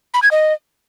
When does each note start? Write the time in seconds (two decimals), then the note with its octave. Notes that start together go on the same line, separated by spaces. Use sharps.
0.14 B5
0.23 G#6
0.31 D#5